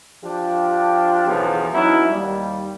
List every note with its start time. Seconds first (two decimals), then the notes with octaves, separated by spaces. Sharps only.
0.23 F3 D4 F4 G4
1.27 B1 E2 C#3 F3 B3
1.73 F#3 B3 C#4 D#4 E4
2.10 D#2 G3